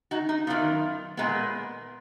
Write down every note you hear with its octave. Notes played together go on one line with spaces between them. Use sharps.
D#4 F#4
D#4
F#2 D#3 F#3 B3 F4
A#2 G#3 B3